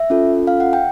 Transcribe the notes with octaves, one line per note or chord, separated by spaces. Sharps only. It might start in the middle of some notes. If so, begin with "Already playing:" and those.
Already playing: E5
C#4 F4 A4
F5
F#5
G5